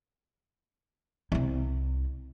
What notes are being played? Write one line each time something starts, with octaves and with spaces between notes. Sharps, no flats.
C2 E4